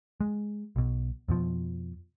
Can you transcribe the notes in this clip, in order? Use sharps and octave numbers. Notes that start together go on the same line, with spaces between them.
G#3
B1 B2
F2 B2 F3